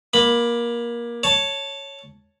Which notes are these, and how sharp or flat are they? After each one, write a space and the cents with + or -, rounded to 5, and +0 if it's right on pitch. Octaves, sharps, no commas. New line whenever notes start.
A#3 +20 B5 +0
C#5 +0 A5 +0